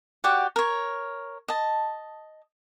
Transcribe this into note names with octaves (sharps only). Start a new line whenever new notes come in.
F#4 G4 D5 F#5
A#4 C#5
D#5 A5